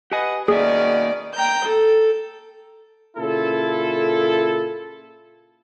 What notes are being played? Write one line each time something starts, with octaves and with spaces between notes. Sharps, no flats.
G4 B4 D#5 F#5 G#5
B2 D#3 A#3 C#4 G#4 D5 E5
G5 A#5 G6
A4
A#2 C#3 E4 F4 A4